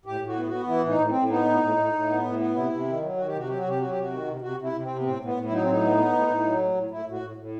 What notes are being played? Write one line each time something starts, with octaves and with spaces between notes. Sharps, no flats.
A2 G4
A2
F#4
B3
B3 F#4
E3 E4
A2
D#4
A2
C4
A2
B3 D#4
A2
A2
A2
A2
B3
A2
B3
C3 E4
C3
D#3
F#3
D#3 F#4
G4
C3 F#4
F#3 G4
F#4
C3
G4
F#3 F#4
G4
C3 F#4
D#3
C3
C3 F#4
C3
E4
C3
C4
C3
B3
A2 C4
A2
B3
A2
E4
F#3 D#4
C4
A2 D#4
B3
B3
A2
A2
F#3
A2
A2
A2 E4
A2
F#4
A2
A2